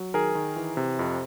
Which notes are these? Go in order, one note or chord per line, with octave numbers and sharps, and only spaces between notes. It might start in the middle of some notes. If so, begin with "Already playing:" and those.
Already playing: F#3
D#3 G#4 A#4
D#3
E3
C3
F2